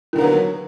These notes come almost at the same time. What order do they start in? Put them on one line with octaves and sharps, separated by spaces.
D#3 D3 A#3 B3 F#3